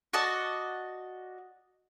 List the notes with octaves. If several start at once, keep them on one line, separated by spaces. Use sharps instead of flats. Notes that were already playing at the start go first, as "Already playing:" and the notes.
F#4 D5 D#5 A5